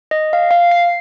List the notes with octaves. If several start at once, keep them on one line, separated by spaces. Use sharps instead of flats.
D#5
F5
F5
C7